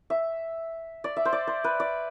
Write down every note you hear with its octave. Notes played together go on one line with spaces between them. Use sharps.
E5
D5
E5
C5
D5
C5
B4
D5